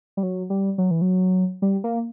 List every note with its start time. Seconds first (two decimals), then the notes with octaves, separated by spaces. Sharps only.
0.17 G3
0.23 F#3
0.50 G3
0.78 F#3
0.91 E3
1.01 F#3
1.62 G3
1.84 A#3